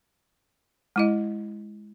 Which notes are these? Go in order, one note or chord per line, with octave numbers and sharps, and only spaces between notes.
G#3 E4 D#5